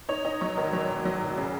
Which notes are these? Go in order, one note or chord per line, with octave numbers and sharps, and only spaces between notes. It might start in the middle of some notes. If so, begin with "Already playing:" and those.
D#4 C#5
D#4 D#5
F#3 C#5
G#1 A#4
F#3 C#5
G#1
F#3
G#1
C#3